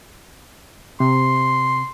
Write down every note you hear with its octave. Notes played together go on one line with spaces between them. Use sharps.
C3 C6